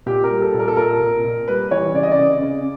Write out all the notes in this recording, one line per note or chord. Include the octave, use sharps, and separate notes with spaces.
A#2 G4
A#4
G3
A4
A#2
A#4
A4
A#2 A#4
A#2
A#2
G3 B4
E3 C#5
C#3 D5
D#5
D5
C#3
C#3